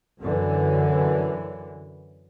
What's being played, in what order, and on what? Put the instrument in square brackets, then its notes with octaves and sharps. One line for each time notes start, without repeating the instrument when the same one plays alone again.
[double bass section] F#2 D3 E3